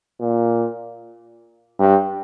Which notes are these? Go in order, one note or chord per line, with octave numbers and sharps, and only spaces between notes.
A#2
G2